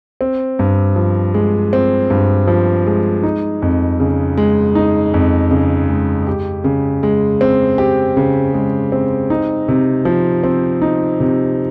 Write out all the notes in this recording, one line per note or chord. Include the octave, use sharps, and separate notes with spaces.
C4
G2
F3
G#3
C4
G2
F3
G#3
D#4
F2
C#3
G#3
D#4
F2
C#3
G#3
G4
C#3
G#3
C4
G4
C#3
G#3
C4
D#4
C3
F3
C4
D#4
C3